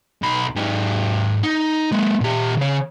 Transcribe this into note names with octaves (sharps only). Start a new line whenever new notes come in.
B1 B5
G#2 G4
D#4
G#3 A#3
A#2 G4
C#3 C#5